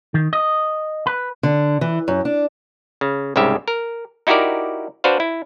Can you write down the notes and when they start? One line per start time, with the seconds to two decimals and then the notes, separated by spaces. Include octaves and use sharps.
0.14 D#3
0.33 D#5
1.07 B4
1.43 D3
1.81 E3
2.08 F#2
2.25 D4
3.01 C#3
3.36 C2 G#2 C#3 G4 E5
3.68 A#4
4.27 D#4 E4 F#4 G4 A#4 D5
5.04 D4 F#4 B4 C5 F5
5.20 E4